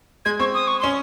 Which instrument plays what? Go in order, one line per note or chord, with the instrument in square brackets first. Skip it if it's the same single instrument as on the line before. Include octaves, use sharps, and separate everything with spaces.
[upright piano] G#3 [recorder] G#6
[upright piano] C4 [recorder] C#6
[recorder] D#6
C#6
[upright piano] C#4 [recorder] C6